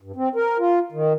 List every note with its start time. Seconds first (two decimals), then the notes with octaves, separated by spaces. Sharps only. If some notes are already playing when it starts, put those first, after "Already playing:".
0.02 G2
0.16 C4
0.35 A#4
0.59 F4
0.92 D#3